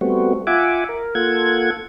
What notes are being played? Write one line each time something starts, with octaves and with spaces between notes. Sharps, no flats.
G3 A3 B3 C4 F#4
F4 E5 F#5 G#5 D6
A#4
A#3 F4 A4 F#5 G#6